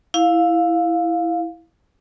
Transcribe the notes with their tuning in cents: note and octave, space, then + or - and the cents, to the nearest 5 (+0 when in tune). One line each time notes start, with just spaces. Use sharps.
E4 +0 F5 +10